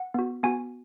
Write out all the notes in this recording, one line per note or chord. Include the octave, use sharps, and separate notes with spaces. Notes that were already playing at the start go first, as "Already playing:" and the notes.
Already playing: F#5
B3 F#4
B3 F#4 G#5